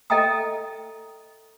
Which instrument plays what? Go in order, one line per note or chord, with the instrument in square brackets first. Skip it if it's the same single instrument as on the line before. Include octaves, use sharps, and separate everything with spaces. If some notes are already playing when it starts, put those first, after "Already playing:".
[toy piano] A4 D#5 E5 G5 A#5 D#6